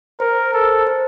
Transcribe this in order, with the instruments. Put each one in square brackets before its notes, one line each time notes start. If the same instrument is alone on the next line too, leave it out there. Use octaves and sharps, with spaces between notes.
[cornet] A#4 [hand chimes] C5
[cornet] A4 [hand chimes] C5
[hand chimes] C5